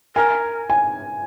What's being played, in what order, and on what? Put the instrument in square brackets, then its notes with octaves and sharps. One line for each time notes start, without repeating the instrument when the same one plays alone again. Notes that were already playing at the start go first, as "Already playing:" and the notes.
[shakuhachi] A#4 [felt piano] G#5
[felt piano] G#5